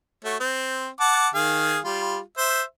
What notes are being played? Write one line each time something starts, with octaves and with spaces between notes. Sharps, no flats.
A3 F#4 C#5
C4
F#5 A5 D6
D#3 G#4 F5
G3 F4
C5 E5